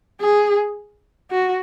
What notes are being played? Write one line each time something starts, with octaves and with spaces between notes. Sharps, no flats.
G#4
F#4